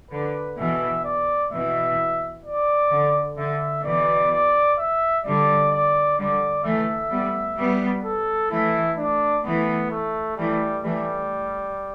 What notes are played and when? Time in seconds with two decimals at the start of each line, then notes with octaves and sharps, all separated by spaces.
0.11 D3 B4
0.58 B2 E3 E5
1.04 D5
1.51 B2 E3 E5
2.45 D5
2.91 D3
3.38 D3 E5
3.84 B2 E3 D5
4.31 D5
4.78 E5
5.25 D3 G3 D5
5.72 D5
6.18 D3 G3 D5
6.64 E3 A3 E5
7.11 G3 B3
7.58 G3 B3
8.04 A4
8.51 E3 A3 E4
8.98 D4
9.44 E3 A3 B3
9.91 A3
10.37 E3 G3 A3
10.84 E3 G3 A3